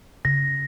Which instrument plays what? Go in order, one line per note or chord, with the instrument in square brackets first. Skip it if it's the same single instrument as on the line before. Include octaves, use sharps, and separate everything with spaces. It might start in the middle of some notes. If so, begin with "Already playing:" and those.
[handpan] C#3 [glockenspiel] A#6